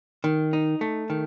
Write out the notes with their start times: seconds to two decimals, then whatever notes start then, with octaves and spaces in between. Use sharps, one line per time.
0.24 D#3
0.53 D#4
0.81 A3
1.10 D#3